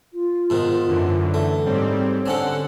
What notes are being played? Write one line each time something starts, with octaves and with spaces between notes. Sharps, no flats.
F4
G#2 B2 D#3
F#2 D3 E3
A3
G#2 G3 C4 C#5
D3 C4 C#4 A4 F#5